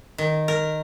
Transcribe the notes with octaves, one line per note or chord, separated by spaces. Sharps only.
D#3
A#4